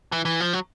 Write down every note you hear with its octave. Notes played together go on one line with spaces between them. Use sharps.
E3
E3
F3
F#3